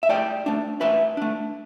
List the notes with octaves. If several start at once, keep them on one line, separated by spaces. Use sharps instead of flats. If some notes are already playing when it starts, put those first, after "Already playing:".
E5
A2 D5 G5
A3 D4
A2 B4 E5
A3 D4